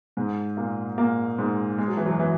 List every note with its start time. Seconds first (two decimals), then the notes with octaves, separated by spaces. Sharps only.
0.17 G#2 G#3
0.57 A#2 A#3
0.98 A#2 A#3
1.38 G#2 G#3
1.78 G#3
1.88 F#3
1.97 E3
2.06 F#2 F#3
2.20 E3